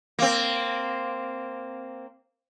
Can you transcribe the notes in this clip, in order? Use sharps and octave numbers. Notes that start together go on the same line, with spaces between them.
A#3 C4